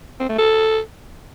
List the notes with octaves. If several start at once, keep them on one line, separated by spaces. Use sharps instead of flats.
C4
A3
A4